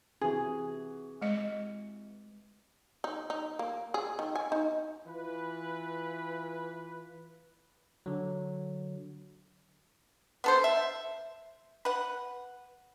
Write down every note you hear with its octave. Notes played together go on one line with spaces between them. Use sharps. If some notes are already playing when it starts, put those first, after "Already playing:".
C3 E3 F#4 G#4
G#3 D#5
D#4
D#4
A#3
G#4
D#3
G#5
D#4
E3 F4 B4
D3 F#3
B3 A4 C5
E5
B4 F#5